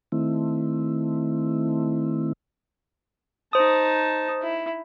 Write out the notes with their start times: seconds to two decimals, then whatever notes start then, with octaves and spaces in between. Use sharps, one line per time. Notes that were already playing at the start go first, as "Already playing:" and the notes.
0.12 D#3 A3 C4 E4
3.53 D#4 C5 A5 D#6
4.42 E4